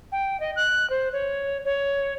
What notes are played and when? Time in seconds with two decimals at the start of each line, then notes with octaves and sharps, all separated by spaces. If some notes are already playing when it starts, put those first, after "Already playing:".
0.12 G5
0.40 D#5
0.56 F#6
0.90 C5
1.13 C#5
1.65 C#5